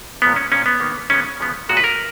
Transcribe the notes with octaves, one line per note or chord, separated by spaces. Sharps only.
A#2 F3 G#3 B3
C#4
A#2 F3 A#3 C#4
B3
D#3 A#3
C#3 G#3 B3 C#4
C#3 F3 B3
A#2 G#3 B3 F#4
B4
A#4